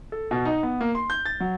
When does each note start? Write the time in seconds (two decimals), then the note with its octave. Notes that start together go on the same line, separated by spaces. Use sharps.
0.12 A4
0.31 B2
0.45 D#4
0.63 B3
0.81 A#3
0.95 C6
1.10 G6
1.26 A6
1.40 F#3